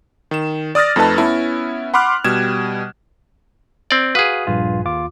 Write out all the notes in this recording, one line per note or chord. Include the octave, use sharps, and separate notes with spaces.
D#3 E7
D5 D#6 F6 A6 A#6
F2 A3 D#4 B4 A5
B3 C#4 E4
F#5 B5 C6 D6 F6 F#6
B2 G3 G#6 E7
C4 D5
F#4 G#4 B4 F5 D#6
A#1 G2 F4
D#2 F4 D6